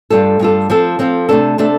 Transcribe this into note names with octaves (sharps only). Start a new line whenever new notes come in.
G2 G3 F4 A4
G2 G3 F4 A4
F3 C4 F4 A4
F3 C4 F4 A4
C3 A3 D4 A4
C3 A3 D4 A4